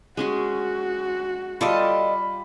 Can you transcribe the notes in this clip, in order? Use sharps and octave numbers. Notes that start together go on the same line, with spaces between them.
G#3 C#4 F#4 G#4
G3 F4 A4 D5 D#5 B5